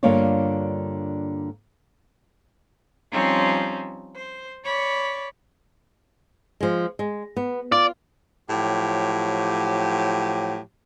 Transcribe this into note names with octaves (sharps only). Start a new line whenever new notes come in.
G2 D3 A#3 F4 C#5 D5
F3 G3 C4 C#4 D#4
C5
C#5 D5 B5 C#6
F3 G#3
G#3
B3
F4 D5
A2 F3 F#3 G4